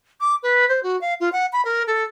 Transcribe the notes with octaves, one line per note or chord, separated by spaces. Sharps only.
D6
B4
C5
F#4
F5
F4
F#5
B5
A#4
A4